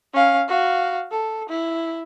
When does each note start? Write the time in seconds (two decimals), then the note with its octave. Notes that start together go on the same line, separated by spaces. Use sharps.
0.14 C#4 F5
0.48 F#4 F5
1.11 A4
1.49 E4